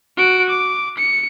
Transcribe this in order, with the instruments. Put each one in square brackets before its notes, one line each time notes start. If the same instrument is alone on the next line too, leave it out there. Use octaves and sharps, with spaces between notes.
[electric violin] F#4 D7
D6
C#7